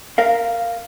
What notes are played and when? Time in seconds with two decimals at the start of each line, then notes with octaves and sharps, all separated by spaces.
0.18 A#4 F5